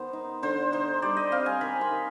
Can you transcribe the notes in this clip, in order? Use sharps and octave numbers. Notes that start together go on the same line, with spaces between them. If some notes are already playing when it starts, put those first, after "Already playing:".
Already playing: D#3 B3 C5
D#4
D3 C5
D#4 C5
G3 D5
D#5
C4 F5
G#5
D#3 B5
C6
D#3